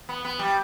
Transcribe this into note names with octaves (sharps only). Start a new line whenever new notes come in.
B3
B3
G3